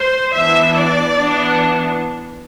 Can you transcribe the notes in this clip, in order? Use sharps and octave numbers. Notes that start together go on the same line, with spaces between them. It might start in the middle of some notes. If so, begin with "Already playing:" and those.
Already playing: C5
E3 B3 D4 E5
D5
E3 B3 D4